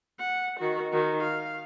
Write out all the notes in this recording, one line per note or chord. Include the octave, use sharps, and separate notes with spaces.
F#5
D#3 F#4
D#3 F#4
F5